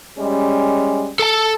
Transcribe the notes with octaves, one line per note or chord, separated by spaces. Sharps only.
G3 G#3 C#4
A4 A5